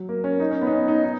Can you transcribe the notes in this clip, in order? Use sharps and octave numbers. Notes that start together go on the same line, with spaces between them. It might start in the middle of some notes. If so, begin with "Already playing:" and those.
Already playing: F#3
A#3
C#4
D#4
C#4
B3
D#4
C#4
D#4
D#4